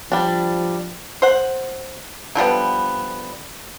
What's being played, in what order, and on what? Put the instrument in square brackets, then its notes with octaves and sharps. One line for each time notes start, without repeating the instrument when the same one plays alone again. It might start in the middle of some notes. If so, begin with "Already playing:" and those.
[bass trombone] F3 [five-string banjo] G3 D4
[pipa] C5 F#5
D3 F3 G3 B3